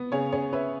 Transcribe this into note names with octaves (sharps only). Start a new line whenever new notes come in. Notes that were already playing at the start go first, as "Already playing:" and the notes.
Already playing: B3
C#3 G#4 C#5
C#4 G#4 C#5
C#4 B4 E5